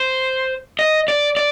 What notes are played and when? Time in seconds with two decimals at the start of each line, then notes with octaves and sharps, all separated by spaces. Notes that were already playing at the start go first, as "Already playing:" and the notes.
Already playing: C5
0.79 D#5
1.08 D5
1.37 D5